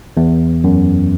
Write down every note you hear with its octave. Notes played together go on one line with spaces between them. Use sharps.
E2
F#2